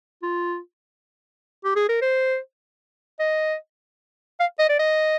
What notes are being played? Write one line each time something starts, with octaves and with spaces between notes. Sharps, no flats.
F4
G4
G#4
A#4
C5
D#5
F5
D#5
D5
D#5